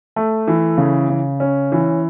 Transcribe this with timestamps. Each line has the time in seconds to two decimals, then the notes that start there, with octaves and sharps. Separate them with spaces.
0.16 A3
0.47 E3
0.78 C#3
1.09 C#3
1.40 C#4
1.72 E3